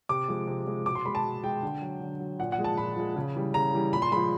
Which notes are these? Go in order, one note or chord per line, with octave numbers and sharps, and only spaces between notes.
C3 D6
F3 G#3
C3
F3 G#3
B2 D6
C6
G#3 B5
A5
B2
G#3 G5
D3
F#3
D3
F#3
A#2 F#5
F#5
F3 G#3
A5
A#2 B5
F3 G#3
C#3
E3 G3
C#3 A#5
E3 G3
A#2 B5
C6
F3 G#3 B5